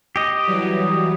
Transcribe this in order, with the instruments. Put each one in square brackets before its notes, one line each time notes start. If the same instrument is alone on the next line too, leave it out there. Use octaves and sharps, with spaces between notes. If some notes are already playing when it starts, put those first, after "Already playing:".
[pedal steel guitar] G4 D#5
[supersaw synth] E3 F#3 G3